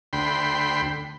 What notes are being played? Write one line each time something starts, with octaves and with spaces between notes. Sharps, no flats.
D2 G5 B5 C6